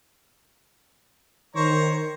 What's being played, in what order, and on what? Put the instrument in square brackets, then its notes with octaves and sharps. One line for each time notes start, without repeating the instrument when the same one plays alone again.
[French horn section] D#3 [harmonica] C5 C#5 A#5